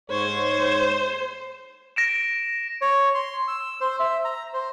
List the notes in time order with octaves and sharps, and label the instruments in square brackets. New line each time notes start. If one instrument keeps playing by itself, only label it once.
[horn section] G#2 C#5 [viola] C5
[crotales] A#6 D7 E7
[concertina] C#5
C6
E6
C5
E5
A#5
C5